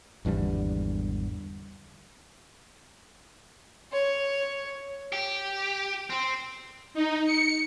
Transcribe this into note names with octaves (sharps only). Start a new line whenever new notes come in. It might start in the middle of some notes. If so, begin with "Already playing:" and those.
G#1 E2 D3 G3
C#5
G4
C4
D#4
C#7